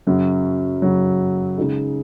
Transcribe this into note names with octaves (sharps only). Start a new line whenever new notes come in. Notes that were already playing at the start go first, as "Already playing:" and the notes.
F#2 C#3 F#3
F#2 C#3 F#3
C#3 G#3 D#4 G#4